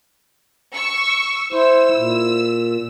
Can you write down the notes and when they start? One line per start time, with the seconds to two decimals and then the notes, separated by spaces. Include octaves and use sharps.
0.74 C#6 E6
1.53 E4 C5 E6
1.96 A#2